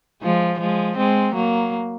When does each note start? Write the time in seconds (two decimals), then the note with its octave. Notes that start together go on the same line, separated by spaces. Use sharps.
0.22 F3 G#3
0.59 F3 G#3
0.97 G#3 C4
1.34 F#3 A#3